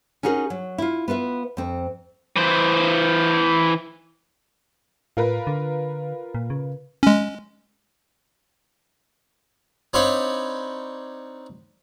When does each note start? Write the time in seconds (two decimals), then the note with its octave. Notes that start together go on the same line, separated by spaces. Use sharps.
0.23 C#4 D#4 F#4 G#4 A#4
0.50 F#3
0.78 E4 F4
1.08 B3 F4 B4 E5
1.57 F2 C4
2.36 E3 C5
5.17 A2 F4 A#4 B4
5.47 D3
6.35 A#2
6.50 C#3
7.03 G#3 C#4
9.93 C4 D4 D#4 C#5 F5 B5